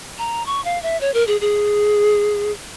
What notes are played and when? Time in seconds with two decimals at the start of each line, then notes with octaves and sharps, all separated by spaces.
0.18 A#5
0.46 C#6
0.65 F5
0.83 E5
1.01 C#5
1.14 A#4
1.27 G#4
1.41 G#4